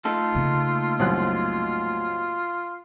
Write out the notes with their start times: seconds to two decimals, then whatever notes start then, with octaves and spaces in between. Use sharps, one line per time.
0.05 A3 D#4 F4 A4
0.35 C#3 A#3
0.99 C2 F#2 F#6